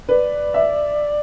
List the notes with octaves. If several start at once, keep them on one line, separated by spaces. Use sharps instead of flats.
B4 D5
E5